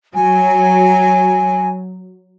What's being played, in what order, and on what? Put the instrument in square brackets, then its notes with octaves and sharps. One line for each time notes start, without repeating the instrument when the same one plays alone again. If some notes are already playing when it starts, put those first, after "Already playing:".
[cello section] F#3 [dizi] G#5